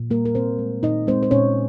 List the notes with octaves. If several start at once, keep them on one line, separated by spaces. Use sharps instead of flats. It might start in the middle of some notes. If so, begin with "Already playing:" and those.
Already playing: A#2
G3 A#3 A#4
A#4
A#2 C4 C5
G#3
A#2 D#4 D#5
G#3 C4 C5
C5
A#2 C#4 C#5